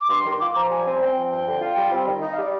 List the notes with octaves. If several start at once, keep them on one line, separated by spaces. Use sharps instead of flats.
D6
G2 C6
D#3
F4 D6
F3 A#5
G3 G#5
C4
C4 G5
F3
G2 G5
D3
F4
G3
C4
D#3
D#4 D#5
F5
G3 D5